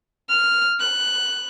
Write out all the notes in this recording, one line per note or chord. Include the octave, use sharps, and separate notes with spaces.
F6
F#6